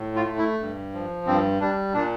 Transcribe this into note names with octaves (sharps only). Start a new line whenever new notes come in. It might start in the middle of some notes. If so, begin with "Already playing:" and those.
Already playing: A2
F4
A3
E4
G2
F3
G2 C4
G3 D4
A#2 D4